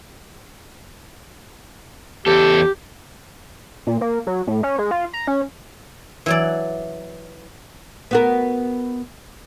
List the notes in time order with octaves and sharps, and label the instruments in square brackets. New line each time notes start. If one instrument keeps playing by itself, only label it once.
[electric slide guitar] E2 A4 [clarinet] G4
[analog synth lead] A#2
A#3
F#3
A2
C#4
G#3
F4
A#5
C#4
[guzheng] E3 F#3 D5
[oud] B3 F#4 A#4